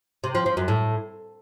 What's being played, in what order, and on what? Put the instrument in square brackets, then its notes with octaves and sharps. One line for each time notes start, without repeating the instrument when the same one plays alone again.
[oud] C3
F3
F3
F#2
A2